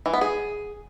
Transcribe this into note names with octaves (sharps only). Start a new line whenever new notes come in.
E3
B3
G#4